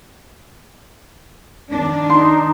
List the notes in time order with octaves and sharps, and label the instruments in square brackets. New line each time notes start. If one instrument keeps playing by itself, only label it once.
[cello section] D#3 D4
[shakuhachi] D#4 [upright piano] C6